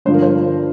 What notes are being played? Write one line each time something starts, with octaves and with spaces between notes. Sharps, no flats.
G1 G2 D3 F3 C5
A#4
C5